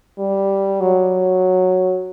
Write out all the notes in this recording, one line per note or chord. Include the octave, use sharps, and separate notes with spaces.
G3
F#3